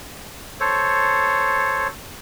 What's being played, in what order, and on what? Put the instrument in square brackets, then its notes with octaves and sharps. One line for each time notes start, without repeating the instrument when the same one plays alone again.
[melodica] A4 C5 C#5